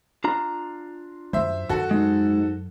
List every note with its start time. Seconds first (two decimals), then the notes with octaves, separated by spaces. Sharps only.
0.24 D4 F4 A#5
1.33 F#2 C5 E5
1.69 F#2 F#4 A4
1.91 G#2 G#3